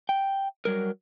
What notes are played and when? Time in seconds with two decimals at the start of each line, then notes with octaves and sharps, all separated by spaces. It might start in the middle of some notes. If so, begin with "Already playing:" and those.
0.09 G5
0.65 F#3 G3 A#4